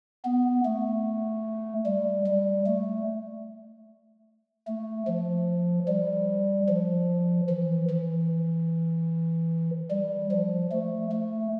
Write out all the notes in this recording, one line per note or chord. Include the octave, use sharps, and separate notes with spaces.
B3
A3
G3
G3
A3
A3
F3
G3
F3
E3
E3
G3
F3
A3
A3